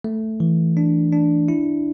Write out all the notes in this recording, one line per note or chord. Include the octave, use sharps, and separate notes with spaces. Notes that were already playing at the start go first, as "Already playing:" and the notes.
A3
E3
D4
D4
E4